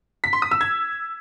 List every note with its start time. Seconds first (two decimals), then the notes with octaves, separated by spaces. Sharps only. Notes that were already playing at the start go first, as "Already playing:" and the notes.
0.24 B6
0.33 C6
0.42 D#6
0.51 E6
0.61 G#6